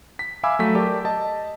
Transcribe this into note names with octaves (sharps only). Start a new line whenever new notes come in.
B6
E5 F5 G#5 B5 D6 E6
F#3 A3 B6
G4 A#4 D5 A5
D#5 A5